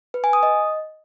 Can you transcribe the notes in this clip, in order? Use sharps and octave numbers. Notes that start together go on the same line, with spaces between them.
B4
G#5
D#6
D#5